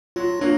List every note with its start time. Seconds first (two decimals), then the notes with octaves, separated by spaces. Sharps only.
0.16 F#3 F4
0.41 F#3 A#3 D4